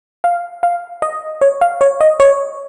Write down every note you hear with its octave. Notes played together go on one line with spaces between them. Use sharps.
F5
F5
D#5
C#5
F5
C#5
D#5
C#5